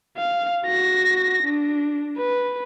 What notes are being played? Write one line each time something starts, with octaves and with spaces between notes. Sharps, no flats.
F5
F#4 A#6
D4
B4